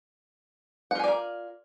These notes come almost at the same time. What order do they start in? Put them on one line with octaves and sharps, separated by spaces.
F#5 F4 G#5 D5 A#4